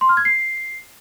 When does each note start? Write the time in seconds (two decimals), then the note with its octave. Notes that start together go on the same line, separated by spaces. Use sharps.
0.01 C6
0.09 F6
0.17 G#6
0.25 C7